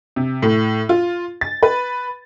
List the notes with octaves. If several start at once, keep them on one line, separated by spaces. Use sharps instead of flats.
C3
A2
F4
A6
B4